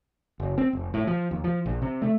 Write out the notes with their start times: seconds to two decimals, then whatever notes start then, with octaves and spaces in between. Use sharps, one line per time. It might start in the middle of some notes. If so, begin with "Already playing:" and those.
0.40 F#1
0.58 C4
0.73 F1
0.94 A2
1.07 F3
1.31 D#2
1.44 F3
1.66 A#1
1.82 C3
2.02 A3